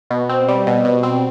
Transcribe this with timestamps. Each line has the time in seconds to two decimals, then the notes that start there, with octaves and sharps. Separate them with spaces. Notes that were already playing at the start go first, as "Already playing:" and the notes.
0.11 B2
0.29 C4
0.48 G3
0.67 B2
0.85 B2
1.03 C4